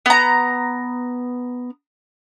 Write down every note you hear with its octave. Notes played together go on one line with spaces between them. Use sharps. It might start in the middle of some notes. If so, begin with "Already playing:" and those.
B3 A#5